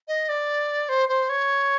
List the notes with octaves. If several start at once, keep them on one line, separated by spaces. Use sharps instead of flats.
D#5
D5
C5
C5
C#5